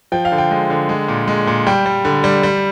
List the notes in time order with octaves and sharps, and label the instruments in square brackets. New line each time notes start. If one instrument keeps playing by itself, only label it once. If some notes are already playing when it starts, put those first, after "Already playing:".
[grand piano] F3 G5
F5
D3
G5
G#3
D3
G#3
A#2
G#3
A#2
G3 G5
G3
D3
G3
G3